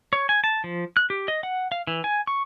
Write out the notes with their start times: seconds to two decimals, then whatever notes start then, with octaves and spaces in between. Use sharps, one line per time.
0.13 C#5
0.29 G#5
0.44 A5
0.64 F3
0.97 F#6
1.10 G4
1.28 D#5
1.43 F#5
1.72 F5
1.87 E3
2.04 G#5
2.27 C#6